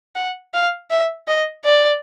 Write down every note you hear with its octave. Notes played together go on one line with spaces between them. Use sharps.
F#5
F5
E5
D#5
D5